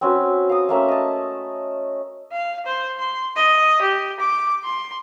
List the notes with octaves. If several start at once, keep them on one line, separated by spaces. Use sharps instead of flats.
C4 C#4 F#4 B4
F5 A#5 D#6
A3 A#3 C#4 E5
D#5 A5
F5
C5
C6
D#5
G4
D6
C6